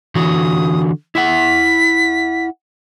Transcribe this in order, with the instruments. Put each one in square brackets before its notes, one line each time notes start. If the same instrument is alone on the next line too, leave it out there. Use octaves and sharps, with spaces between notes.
[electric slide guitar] D3 E3 F#4 [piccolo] D#6
[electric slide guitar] E4 E5 F#5 [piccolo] B6